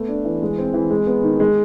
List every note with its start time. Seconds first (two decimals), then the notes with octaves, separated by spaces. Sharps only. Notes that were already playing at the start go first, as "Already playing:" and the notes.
Already playing: A3 B3
0.08 D4
0.25 E3
0.42 G#3
0.58 C4
0.74 E3
0.91 G#3
1.07 B3
1.23 D#3
1.40 G#3